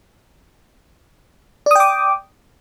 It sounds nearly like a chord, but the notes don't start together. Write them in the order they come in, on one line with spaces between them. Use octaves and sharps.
D5 D#6 G5 D6